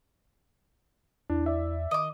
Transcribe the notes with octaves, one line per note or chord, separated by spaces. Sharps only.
E2 D4 E4
D5 E5
D#3 D#5 D6